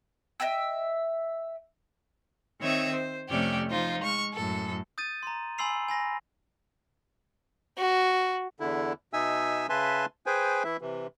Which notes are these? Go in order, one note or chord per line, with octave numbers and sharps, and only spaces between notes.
D#5 E5 G5 E6
D#3 C4 C#5 E5 D#6
C5
F2 C3 A3 C#4 G4 D5
F3 D#4 F4 C5
G#3 C#6 F6
F#2 A2 A4
D#6 G6 A6 D#7
A#5 C6
G#5 B5 C6 E6 C7 F7
G#5 B5 A#6
F#4
E2 D3 E4
B2 D#4 E5 G#5 E6
C#3 B4 E5 G#5 A5 C6
G#4 B4 C5 G5 G#5
E3 E4 E5
C3 E3